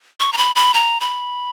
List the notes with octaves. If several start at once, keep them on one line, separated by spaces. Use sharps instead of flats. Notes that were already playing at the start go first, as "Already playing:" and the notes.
C#6
A#5
B5
B5
A#5
B5